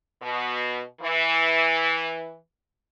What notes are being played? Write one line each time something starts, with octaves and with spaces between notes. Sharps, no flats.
B2
E3